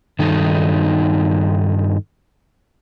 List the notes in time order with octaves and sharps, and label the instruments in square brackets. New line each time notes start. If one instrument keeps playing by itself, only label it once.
[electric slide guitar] G2 D#3 D#4 A4